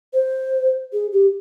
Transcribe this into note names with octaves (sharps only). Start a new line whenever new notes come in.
C5
G#4
G4